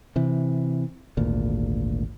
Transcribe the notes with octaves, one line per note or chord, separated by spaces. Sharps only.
C3 E3
G#1 D2 A#2